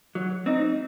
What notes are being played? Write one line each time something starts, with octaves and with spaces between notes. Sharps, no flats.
F#3
C4 D#4